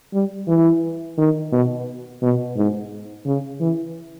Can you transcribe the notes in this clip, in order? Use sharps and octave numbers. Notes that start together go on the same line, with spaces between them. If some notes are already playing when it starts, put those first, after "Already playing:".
G3
E3
D#3
B2
B2
G#2
C#3
E3